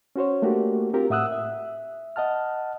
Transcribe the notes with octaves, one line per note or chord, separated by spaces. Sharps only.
C#4 F#4 C5 C#5
A3 A#3 D4 F#4 G4 A#4
C4 F4 G4 A#4
A2 E5 F#5 D#6 E6 F#6
E5
D#5 F#5 A5 F6